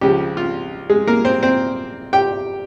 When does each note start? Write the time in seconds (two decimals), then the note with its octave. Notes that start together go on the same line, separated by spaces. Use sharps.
0.01 C#2 C#3 F3 G4
0.37 F4
0.90 G#3 G#4
1.07 A#3 A#4
1.25 C4 C5
1.43 C4 C5
2.13 G4 G5